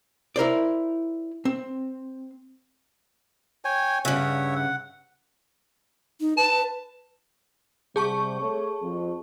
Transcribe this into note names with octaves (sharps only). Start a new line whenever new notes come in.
E4 A#4 C5 D5
C4
C#5 G5 G#5
G2 C#3 C#5 E5 F#5
F#5
D#4
B4 A5
C3 G3 G#4 A5 C#6
A3 A4 C#5
F2